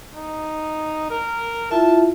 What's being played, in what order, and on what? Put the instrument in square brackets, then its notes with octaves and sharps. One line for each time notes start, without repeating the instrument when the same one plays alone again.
[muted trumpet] D#4
A#4
[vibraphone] E4 F4 E5 [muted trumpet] A5